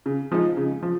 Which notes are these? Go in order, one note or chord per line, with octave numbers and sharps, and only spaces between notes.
C#3
F3 G#3 D#4
C#3
F3